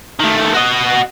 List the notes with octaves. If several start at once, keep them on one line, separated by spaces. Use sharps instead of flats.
D#3 A3
F#4 D#5